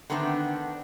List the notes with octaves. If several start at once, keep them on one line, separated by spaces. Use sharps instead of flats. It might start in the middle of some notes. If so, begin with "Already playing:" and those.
D3 D#3 A3 B3 C4 D4